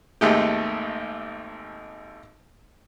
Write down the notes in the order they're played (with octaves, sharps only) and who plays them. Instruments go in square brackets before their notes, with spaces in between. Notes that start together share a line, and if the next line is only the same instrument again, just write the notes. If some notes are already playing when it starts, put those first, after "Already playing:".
[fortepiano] G#1 D#2 G#3 A3 D#4 G4